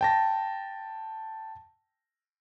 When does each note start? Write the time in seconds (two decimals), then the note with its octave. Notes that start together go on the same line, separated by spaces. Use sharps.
0.01 G5 A5 A#6